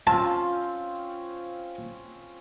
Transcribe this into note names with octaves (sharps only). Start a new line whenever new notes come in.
C4 C#4 F4 A5